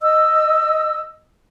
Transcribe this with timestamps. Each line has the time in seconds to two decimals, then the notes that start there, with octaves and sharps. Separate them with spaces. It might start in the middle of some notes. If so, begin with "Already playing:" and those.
0.01 D#5 E6